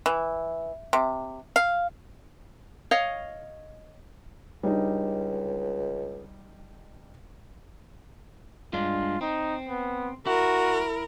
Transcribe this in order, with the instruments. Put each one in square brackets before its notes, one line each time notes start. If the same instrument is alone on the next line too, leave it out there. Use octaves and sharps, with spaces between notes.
[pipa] E3
C3
F5
[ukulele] C#5 D#5 F5
[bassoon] C#2 [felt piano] G3 D4 D#4
[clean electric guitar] G2 G#3 D4 [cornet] F4
[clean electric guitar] C4 [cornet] D#4
[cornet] B3
[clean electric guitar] E4 [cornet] F#4 [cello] A#4